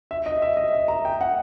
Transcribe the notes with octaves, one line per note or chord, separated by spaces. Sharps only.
E5
D#5
E5
D#5
E5
A#5
G5
F#5